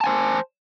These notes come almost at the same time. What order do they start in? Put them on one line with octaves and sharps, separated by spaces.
A5 G#5 C5